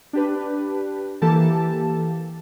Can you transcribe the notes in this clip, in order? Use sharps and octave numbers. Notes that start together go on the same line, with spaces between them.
D4 G4 B4
E3 A#3 G4 A4 A5